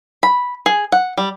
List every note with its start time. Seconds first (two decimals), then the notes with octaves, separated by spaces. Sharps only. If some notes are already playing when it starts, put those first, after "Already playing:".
0.23 B5
0.66 G#4
0.92 F#5
1.17 G3